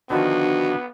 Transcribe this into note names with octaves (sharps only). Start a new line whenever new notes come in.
D3 D#3 F3 B3 D4 F#4